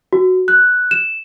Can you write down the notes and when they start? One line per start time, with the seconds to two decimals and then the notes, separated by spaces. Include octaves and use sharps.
0.13 F#4
0.48 F#6
0.91 E7